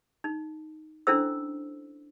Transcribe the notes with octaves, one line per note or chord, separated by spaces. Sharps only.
D#4
C#4 D4 E4 A4 C5 E6